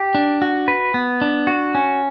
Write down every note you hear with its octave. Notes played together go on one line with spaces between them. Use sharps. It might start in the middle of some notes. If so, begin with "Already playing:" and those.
Already playing: G4
D4
F#4
B4
B3
D4
F#4
C#4